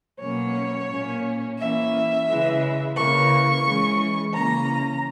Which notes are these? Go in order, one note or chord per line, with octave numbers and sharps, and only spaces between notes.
B2 F#3 A#3 C#4 C#5
A#2 A#3 C#4
E3 A#3 C#4 E5
C#3 E3 G#3
C#3 E3 A#3 C#6
E3 G#3 C#4
C#3 E3 A#3 C#4 A#5